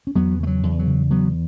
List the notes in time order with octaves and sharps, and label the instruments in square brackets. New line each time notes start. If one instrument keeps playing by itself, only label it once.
[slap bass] C#4
E2 F#3 B3
C#3 A3
F#3
E2
F#3
C#3
E2 F#3 B3